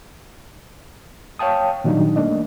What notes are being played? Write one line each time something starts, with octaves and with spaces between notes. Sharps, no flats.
C#5 F5 G5 A5 D#6
A#2 D#3 F#3 G3 D4 D#4
A3 A#3 D4 D#5